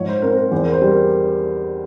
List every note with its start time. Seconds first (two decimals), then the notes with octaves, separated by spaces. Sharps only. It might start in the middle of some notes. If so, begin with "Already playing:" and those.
Already playing: G#2 F3 C#5
0.08 C5
0.22 C4 A#4
0.30 C5
0.37 A#4
0.51 E2 C5
0.65 A#4
0.72 C5
0.82 G3
0.91 A#4